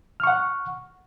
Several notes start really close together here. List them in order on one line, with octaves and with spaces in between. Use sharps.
F6 C#6 F#5